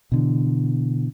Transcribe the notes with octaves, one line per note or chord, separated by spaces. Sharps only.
B2 D3 E3